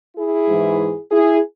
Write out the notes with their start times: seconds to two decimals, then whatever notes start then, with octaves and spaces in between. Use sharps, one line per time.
0.16 E4 G#4
0.48 G#2 E3
1.10 E4 G#4